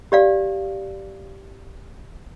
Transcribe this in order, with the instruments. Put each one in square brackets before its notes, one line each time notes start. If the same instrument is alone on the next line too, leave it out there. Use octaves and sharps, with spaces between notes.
[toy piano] G4 D5 F5